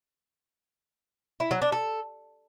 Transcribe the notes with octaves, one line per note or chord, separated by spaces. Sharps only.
E4
F#3
D4
A4